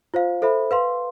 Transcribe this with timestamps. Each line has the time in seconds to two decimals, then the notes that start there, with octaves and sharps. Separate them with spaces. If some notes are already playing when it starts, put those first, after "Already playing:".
0.14 F4 C5 F5
0.42 A4 C5 E5 B5
0.71 B4 F5 C6